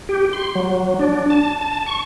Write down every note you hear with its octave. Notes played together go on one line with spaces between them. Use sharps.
G4
C6
F#3
D4
A5
A5
C#6